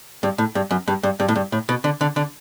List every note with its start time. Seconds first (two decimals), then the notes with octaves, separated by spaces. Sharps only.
0.23 G2
0.38 A2
0.55 G2
0.71 F#2
0.88 G2
1.03 G2
1.20 G2
1.28 A2
1.36 G2
1.52 A2
1.69 B2
1.84 D3
2.01 D3
2.16 D3